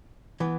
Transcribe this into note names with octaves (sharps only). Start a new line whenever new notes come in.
E3 B3